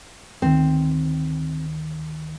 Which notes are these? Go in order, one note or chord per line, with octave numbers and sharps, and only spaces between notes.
D2 D#3 C4